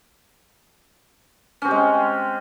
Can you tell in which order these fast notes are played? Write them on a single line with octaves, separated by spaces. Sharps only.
C#4 C4 G4 G#3